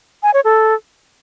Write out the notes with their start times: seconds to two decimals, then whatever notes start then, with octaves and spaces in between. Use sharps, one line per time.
0.23 G#5
0.34 C#5
0.44 A4